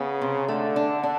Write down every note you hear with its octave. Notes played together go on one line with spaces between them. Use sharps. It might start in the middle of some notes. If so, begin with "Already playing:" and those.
Already playing: C#3 B3
C3
D3 A3
D4
D4